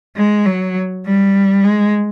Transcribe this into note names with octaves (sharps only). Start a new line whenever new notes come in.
G#3
F#3
G3
G#3